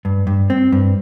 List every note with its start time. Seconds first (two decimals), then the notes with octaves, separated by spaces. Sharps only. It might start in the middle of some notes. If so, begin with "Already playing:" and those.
0.05 G2
0.27 G2
0.50 C4
0.72 G2